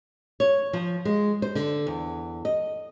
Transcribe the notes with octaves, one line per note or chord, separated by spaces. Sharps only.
C#5
F3
G#3
C5
D3
E2
D#5